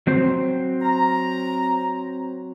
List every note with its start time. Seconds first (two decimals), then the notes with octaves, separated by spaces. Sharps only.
0.07 F#3 C4 C5
0.81 A#5